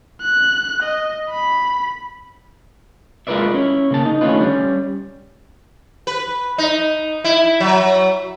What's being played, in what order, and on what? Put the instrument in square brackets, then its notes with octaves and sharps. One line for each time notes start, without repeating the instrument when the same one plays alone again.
[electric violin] F#6
D#5
B5
[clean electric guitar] G#3 F4 A#4 B4 D5 E5
C#4 E4
C#3 A#3 A5
D#4
D3 A3 C#4 E4 F4 B4
G3 C#4
[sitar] B4
D#4
E4
F#3